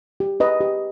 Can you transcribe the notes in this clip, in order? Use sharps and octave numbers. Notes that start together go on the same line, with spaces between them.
G4
B4 D#5
G4